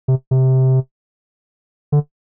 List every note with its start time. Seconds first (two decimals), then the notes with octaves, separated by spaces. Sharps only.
0.08 C3
0.31 C3
1.92 D3